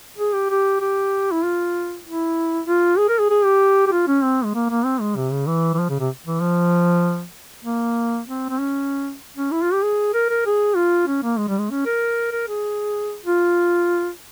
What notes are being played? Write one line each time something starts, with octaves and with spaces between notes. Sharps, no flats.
G#4
G4
G4
G4
E4
F4
E4
F4
G#4
A#4
G#4
G#4
G4
G4
F4
C#4
C4
G#3
A#3
A#3
C4
G#3
C3
C#3
E3
E3
F3
C#3
C3
E3
F3
A#3
C4
C4
C#4
C#4
E4
F4
G4
G#4
A#4
A#4
G#4
F4
C#4
A#3
G#3
G3
G#3
C#4
A#4
A#4
G#4
F4